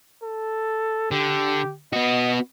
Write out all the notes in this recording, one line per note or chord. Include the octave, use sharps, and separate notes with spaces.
A4
D3 G4
B3 F#4 D#5